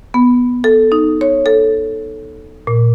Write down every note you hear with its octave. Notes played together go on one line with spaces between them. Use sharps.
B3
A4
D#4
C#5
A4
A#2